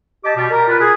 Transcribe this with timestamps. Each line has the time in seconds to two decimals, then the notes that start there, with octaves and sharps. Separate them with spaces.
0.24 G4 D#5 A5 D6
0.36 B2 G3
0.50 A#4
0.68 F4 B4
0.80 G#4